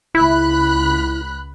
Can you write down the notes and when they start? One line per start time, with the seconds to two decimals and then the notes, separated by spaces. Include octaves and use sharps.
0.15 C#2 E4 B5 F#6